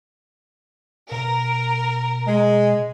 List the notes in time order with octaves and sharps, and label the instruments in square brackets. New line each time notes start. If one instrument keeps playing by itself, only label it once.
[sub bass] B2 [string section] A#4
[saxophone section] G#3